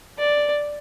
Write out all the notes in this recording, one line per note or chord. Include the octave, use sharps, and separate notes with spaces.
D5